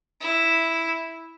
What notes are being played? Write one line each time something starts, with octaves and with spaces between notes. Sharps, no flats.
E4